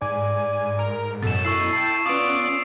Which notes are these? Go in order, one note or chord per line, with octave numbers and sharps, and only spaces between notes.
G#2 D5 G#5
A#4
F#2 B2 A4 A6 E7
E4 C#6 E6 C7
G5 A5 C7
B3 C#4 F4 D5 D#6 D7